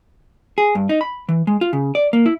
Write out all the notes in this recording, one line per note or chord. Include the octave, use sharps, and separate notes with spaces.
G#4
G2
D#4
B5
E3
G#3
F4
C#3
D5
A#3
E4